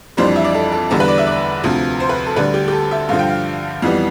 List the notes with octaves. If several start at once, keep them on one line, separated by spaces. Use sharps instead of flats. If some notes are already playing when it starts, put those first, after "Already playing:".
F2 E3 G3 D4 C5
E5
D5
A4
A4
E2 D3 G3 A4
B4
D5
E5
D5
D2 C3 F3
C5
B4
A4
D2 D3 G3 D4 B4
G4
G4
A4
E5
G2 D3 F3 F5
G5
F5
F2 E3 G3 B3